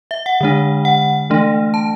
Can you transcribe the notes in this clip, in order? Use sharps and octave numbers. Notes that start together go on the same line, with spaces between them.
E5
F#5
D3 G#3 D4
F#5
E3 A3 D4
A5